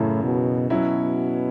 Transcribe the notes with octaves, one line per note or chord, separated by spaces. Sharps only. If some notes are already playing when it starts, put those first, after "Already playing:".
Already playing: F#2 A2 C#3 E3
B2
B2 F#3 C#4 E4